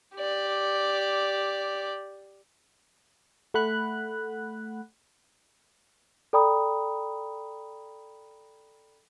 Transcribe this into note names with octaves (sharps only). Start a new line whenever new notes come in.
G4 D5
A3 F#5 B5 F#6
A4 D5 G5 A#5 B5 D#6